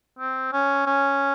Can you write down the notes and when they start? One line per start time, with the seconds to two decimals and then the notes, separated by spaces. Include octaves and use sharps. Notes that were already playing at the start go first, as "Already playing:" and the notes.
0.19 C4
0.53 C#4
0.87 C#4